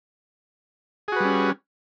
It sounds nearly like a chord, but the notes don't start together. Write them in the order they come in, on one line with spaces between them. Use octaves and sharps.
G#4 F#4 B4 G3 C#4